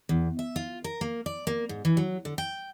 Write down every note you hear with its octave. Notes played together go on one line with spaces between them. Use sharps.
E2
E5
F4
A#4
A#3
D5
A#3
G#2
E3
F#3
D3
G5